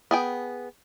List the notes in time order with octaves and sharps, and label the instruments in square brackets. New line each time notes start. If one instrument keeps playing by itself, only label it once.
[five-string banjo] B3 G#4 G5